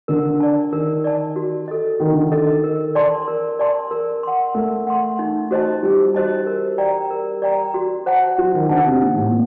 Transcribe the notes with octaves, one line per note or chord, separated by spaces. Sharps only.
D3 A#4
D5 A5
D#3 A#4
D5 A5
F#4
A4 D#5
D#3 F#4
D3
D#3
A4 D#5
A#4
D5 A5 C6
A#4
D5 A5 C6
A#4
F#5 C6
A3 A#4
F#5 C6
D#4
F#4 C5 D#5 A5
G3 D#4
F#4 C5 D#5 A5
A#4
D5 G5 A#5
A#4
D5 G5 A#5
F#4
C5 F#5 A5
F#3 F#4
D#3
D3 C5 F#5 A5
C3
A#2 D#4
A2
A#2